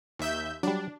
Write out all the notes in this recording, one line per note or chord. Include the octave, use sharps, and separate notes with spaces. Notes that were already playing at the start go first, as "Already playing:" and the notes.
D#2 E5 G6
F#3 G3 D4